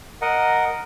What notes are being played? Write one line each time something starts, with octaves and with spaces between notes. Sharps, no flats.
A#4 D#5 F#5